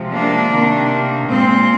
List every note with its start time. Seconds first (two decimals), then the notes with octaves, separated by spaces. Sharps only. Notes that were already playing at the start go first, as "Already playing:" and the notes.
Already playing: C3 F3 G#3
0.11 A#3 D4
0.50 C3 D#3 A#3
1.28 A#2 G#3 C4